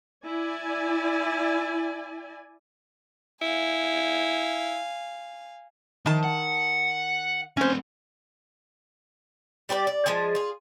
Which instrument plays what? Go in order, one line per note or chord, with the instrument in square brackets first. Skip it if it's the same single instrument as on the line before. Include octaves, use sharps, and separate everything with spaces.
[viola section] E4 D5 G#5
[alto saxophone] E4 [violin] F5 G#5
[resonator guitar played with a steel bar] D#3 A5 [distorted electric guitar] F3
[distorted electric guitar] F#5
[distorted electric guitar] A3 C4 [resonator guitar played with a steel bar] C#4 C5
[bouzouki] G3 G4 B4 D5
D5
F3 G#3 G#4 G#5
F4 G#4